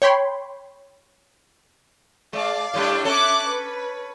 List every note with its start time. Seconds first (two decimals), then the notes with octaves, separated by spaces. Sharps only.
0.02 C#5 G5 B5 C6
2.33 G#3 D5 F5
2.74 A2 G3 D4
3.04 C#4 A4 E5 D6 F#6
3.46 B4